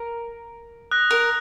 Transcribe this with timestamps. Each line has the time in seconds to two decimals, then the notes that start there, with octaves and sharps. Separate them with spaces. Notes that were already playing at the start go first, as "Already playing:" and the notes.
Already playing: A#4
0.91 D#6 F#6 A#6
1.11 A#4